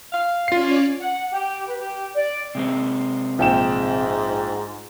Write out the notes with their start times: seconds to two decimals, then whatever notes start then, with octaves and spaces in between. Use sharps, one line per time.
0.13 F5
0.48 C#4 F4 C#5 D5 C7
1.00 F#5
1.32 G4
1.67 B4
1.79 G4
2.15 D5
2.55 C3 G#3 C4
3.39 A#1 G#2 G5 E7